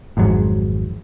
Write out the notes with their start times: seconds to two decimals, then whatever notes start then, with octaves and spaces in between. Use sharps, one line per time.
0.17 G#1 F2 G#2 F#3